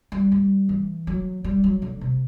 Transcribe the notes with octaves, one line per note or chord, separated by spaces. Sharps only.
G3
G3
E3
F#3
G3
F#3
D3
C3